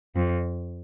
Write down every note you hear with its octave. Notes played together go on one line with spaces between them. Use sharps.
F2